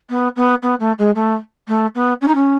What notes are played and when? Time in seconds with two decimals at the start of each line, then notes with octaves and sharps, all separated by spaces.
0.09 B3
0.36 B3
0.62 B3
0.79 A3
0.98 G#3
1.15 A3
1.68 A3
1.95 B3
2.21 C#4
2.27 D#4
2.34 C#4